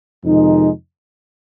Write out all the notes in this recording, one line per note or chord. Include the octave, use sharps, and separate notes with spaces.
F2 C3 D#3 G#3 D#4